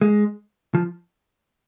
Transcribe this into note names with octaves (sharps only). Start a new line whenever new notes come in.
G#3
F3